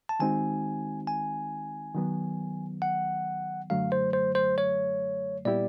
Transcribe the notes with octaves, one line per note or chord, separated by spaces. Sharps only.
A5
D#3 G#3 C4 D#4 F#4 G#5
G#5
D#3 F#3 B3
F#5
F#2 D3 F#3 A3 F5
C5
C5
C5
C#5
A#2 G3 B3 E4 G4 D5